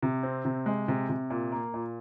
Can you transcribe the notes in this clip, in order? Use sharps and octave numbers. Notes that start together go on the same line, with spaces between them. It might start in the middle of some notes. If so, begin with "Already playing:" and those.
C3
C4
C3
G#3
C3
C3
A#2
A#3
A#2